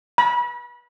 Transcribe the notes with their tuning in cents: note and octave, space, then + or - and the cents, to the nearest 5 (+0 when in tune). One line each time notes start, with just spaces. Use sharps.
B5 -30